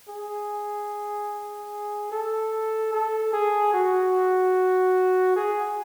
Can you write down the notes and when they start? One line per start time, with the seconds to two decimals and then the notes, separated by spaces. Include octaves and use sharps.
0.09 G#4
2.12 A4
2.92 A4
3.33 G#4
3.73 F#4
5.36 G#4